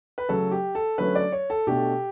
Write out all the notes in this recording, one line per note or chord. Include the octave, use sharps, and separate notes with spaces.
B4
C#3 F#3 A3 A4
G4
A4
D3 F#3 A3 C#4 B4
D5
C#5
A4
B2 A3 D4 G4